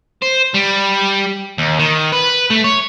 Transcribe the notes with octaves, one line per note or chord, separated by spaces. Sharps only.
C5
G3
D#2
D#3
B4
A3
C#5